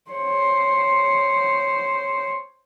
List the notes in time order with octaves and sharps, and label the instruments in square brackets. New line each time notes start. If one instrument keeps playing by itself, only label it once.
[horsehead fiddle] C5 C#5